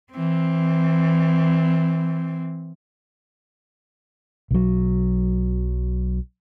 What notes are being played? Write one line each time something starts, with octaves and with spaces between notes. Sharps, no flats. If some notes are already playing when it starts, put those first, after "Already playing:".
E3 C4
B1 F#3